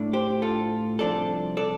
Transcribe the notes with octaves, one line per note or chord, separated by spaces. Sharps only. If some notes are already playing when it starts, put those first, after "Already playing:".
Already playing: A2 A3 D4
G4 C5
F4 A4
C2 C3 F3 D4 A4 D5
A4 D5